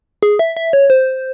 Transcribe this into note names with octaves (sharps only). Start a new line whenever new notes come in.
G#4
E5
E5
C#5
C5